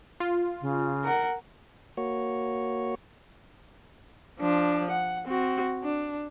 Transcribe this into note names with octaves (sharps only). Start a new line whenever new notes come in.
F4
C#3
A#4 F#5
A#3 F#4 C#5
F3 D4
F#5
C4 F#4
D4